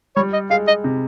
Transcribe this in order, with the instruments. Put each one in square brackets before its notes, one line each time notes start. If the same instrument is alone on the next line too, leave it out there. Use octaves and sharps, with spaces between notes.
[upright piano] G3 [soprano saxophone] C#5
[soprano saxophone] D#5
[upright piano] G#3 [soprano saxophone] F5
[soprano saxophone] D#5
[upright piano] C3